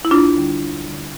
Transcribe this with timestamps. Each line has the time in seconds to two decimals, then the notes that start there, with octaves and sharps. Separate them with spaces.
0.05 E4
0.11 D2 D4 F4
0.36 D3 G3
0.62 D2
0.86 D3 G3